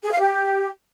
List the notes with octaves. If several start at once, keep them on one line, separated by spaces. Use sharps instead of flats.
G#4
F5
G4